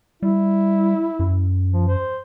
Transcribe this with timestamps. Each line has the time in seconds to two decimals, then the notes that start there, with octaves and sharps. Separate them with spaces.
0.22 G3 E4
1.19 F#2
1.72 F3
1.88 C5